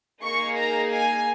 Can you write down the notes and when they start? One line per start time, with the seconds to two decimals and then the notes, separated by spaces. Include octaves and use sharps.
0.22 A#3 D#4 G#4 C#6
0.57 A#5
0.92 G#5